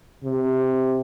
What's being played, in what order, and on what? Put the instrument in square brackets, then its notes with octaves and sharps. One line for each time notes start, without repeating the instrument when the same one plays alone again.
[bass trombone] C3